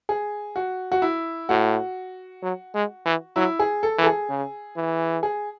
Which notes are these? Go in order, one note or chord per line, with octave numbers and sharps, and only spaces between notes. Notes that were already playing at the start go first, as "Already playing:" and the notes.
G#4
F#4
F#4
E4
A2 F#4
F#3
G#3
E3
F#3 E4
G#4
A4
E3 A4
G#4
C#3
E3
G#4